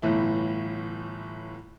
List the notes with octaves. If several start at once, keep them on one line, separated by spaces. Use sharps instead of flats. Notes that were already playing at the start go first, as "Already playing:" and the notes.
G1 A2 E3 E4